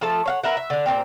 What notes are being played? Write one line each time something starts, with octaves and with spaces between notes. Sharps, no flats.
F3 A3 A4 A5
C#5 F5 F#5
A#4 B4 E5 F#5
E5
D3 D4
A#2 A#3 C4 G4